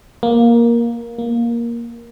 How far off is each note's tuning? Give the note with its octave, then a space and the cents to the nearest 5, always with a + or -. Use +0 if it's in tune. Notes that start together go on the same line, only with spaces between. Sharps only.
A#3 +10
A#3 +10